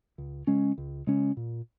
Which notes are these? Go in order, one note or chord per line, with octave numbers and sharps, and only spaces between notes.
C#2
C#3 G#3 C#4
C#2
C#3 G#3 C#4
A#2